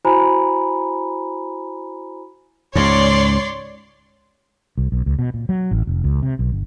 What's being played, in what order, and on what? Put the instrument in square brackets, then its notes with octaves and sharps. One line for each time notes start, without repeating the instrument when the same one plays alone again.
[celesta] E4 F#4 C5 G#5 A#5 B5
[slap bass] C#2 G#2 [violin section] C#5 D5 C6
[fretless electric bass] C2
B1
C#2
B2
A#2
F#3
A1
F1
C#2
C3
B1
G1